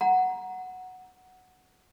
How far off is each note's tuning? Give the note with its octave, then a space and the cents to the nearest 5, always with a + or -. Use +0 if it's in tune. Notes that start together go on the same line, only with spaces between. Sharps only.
F#5 +0 A#5 +15